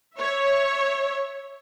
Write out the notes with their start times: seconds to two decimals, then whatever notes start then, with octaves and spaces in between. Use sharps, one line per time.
0.17 C#5 E5